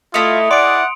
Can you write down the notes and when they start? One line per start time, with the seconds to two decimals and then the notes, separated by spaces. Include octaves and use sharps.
0.14 A3 E4 F4 D#5 D#6 C#7 F7
0.51 G#4 D5 F#5 C6 D7